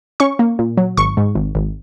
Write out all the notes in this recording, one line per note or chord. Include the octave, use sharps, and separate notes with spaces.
C#4 C#6
A#3
A#2
F#3
G#1 C#6
G#2
G#1
G#1